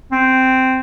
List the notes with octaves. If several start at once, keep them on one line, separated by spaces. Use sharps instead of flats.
C4